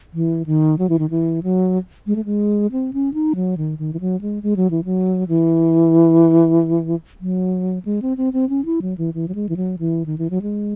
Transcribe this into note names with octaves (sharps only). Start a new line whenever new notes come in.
E3
D#3
F#3
E3
D#3
E3
F#3
G#3
A3
G#3
C4
C#4
D#4
F#3
D#3
D#3
E3
F#3
G#3
G#3
F#3
E3
F#3
E3
F#3
G#3
C4
C4
C4
C#4
E4
F#3
E3
E3
F#3
G#3
E3
F#3
E3
D#3
E3
F#3
G#3